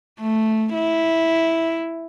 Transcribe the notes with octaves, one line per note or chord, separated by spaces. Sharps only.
A3
E4